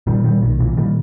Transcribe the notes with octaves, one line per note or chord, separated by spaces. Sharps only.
A#2 D#3 G3
A#2 D#3 G3
B1 D#3
A#2 E3
A#2 D#3 G3